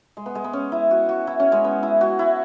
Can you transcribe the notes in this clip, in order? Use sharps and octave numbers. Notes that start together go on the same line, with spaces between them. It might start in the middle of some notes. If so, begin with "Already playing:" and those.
G#3
B3
G#3
B3
C#4
E4
F#4
F#4
E4
C#4
G#3
B3
E4
F#4
E4